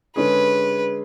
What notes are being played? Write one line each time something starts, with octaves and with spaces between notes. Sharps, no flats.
D3 G#3 C#4 G#4 B4